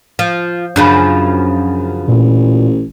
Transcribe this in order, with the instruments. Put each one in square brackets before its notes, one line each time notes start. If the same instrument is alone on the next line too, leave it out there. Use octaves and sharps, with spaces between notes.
[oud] F3
[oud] F#2 C#3 F3 [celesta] D4 B5
[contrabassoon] A1 [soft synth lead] A#2